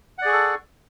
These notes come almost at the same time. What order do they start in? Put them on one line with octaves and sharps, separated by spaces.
F#5 D5 G#4 C#6 A4